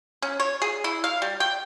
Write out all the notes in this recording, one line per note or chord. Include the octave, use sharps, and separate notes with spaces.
C#4
C#5
G#4
E4
F5
G3
G5